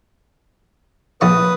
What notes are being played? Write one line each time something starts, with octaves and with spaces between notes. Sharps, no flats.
A#1 E4 B4 C#6 D#6